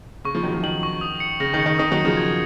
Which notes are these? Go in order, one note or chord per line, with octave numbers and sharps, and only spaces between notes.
C#3 C#6
C#3 F3
D#3 F#3 C#6
C#3 F3
D#3 F#7
C#6
D#6
C#7
C#3 A#6
D#3
C#7
D#3
D#3 D#6
D#3 F#3
C#7
C#3 F3
G#6